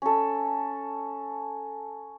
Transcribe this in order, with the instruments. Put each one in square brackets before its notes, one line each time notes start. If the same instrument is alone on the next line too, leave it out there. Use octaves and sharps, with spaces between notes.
[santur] C#4 A4